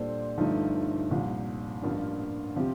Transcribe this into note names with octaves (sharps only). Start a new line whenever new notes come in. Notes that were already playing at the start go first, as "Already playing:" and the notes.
Already playing: A#2 G3 D4 A4 C5
G1 G2 F3 A3 D#4
C2 A#2 F3
A1 G2 F3 A#3 F4
C3 F3 C4 G4